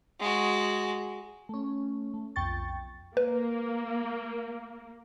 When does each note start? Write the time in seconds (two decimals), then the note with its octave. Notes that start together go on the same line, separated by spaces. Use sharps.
0.20 G#3 F#4
1.49 A3 C#4
2.14 A3
2.36 B1 F2 G5 C#6 A6
3.17 A#3 B4